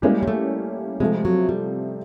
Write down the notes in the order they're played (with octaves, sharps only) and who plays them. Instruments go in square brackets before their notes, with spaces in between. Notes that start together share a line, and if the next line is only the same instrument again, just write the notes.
[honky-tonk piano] G3 A#3 C#4 E4 G4 [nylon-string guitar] G#3
[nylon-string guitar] G#3
A3
[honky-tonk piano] C3 F3 A3 [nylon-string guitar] G#3
[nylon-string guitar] F#3
G3